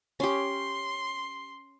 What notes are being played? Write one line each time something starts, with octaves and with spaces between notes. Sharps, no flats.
C#4 G4 C6